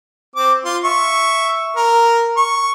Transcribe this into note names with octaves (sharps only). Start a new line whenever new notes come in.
C4 D6
F4 C6
E5 C#6
A#4
C#6